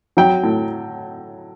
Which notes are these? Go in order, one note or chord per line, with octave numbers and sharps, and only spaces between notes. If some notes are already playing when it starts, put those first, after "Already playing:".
F#3 G5
A2